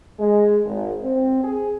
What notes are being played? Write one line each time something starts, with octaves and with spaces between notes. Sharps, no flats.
G#3
G#1
C4
G#4